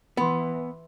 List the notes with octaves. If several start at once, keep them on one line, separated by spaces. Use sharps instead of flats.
E3 B3 B5 C6